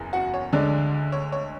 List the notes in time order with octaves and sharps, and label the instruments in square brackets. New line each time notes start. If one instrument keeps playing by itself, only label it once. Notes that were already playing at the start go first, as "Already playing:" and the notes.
Already playing: [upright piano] F#1 E2 C#3
F#4 F#5
C#5
D2 D3 G#3 D4 D5
C#5
C#5